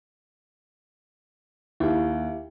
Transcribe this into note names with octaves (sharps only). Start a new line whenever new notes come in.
D#2 E4 G4